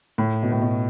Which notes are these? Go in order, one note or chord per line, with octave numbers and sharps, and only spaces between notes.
A2
B2
A2
B2